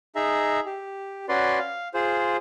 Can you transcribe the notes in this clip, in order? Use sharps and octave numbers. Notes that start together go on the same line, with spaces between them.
D#4 G#4 E5 A#5
G4
C#4 F#4 B4 D5 C6
F5
F4 G#4 C5